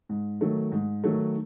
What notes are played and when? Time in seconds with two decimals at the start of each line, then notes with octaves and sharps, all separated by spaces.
0.09 G#2
0.41 D#3 F#3 A3
0.72 G#2
1.04 D#3 F#3 A3